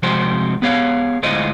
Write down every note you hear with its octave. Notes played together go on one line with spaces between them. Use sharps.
C3 F3 G#3 C4 F#4 C5
B3 G#4 C#5 F5
D2 A2 G#3 F4 C5 D#5